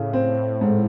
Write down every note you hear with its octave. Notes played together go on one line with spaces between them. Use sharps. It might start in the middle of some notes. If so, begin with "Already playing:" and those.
Already playing: A2 C#3
C4
G#2